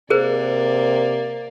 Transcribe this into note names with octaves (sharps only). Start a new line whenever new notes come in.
C3 A#3 G#4 A#4 C5 D5